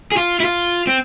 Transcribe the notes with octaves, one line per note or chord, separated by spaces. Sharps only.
G#4
F4
E4
F4
C4